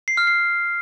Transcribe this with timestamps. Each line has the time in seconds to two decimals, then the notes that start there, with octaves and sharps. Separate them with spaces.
0.08 C7
0.17 F6
0.27 C7